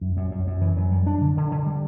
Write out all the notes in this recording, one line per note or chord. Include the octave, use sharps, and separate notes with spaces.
F#2
F#2
F#2
F#2
E3
F#2
G3
D4
D3
D3
D3
G3